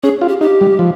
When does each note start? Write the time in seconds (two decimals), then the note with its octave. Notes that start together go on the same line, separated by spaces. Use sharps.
0.03 C#4 G#4
0.21 F4
0.28 G4
0.41 D#4 G4
0.61 G3
0.79 F3